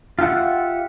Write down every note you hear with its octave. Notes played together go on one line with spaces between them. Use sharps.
F4 G4 E5 F#5